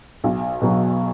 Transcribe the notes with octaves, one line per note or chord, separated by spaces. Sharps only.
B1
B2 F#3